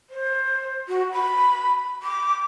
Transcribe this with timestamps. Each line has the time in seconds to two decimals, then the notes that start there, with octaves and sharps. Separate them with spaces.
0.10 C5
0.88 F#4
1.12 B5
2.03 D6